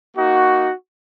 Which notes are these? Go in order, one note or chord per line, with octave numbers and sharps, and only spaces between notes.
A#3 D#4 F#4